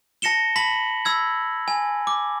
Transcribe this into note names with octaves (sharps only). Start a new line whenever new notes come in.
A5 A#6 C#7 E7 G7
A5 B5 B6 F#7
B5 E6 G#6
G#5
D6